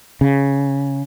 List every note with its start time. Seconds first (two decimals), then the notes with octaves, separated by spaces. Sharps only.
0.21 C#3